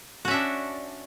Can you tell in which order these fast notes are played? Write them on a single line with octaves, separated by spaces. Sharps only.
F#4 C#4 E5 D4